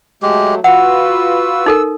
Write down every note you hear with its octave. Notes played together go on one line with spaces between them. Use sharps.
F#3 G#3 A3 G4
F4 F#4 B4 F#5 E6
D#4 A4 A#4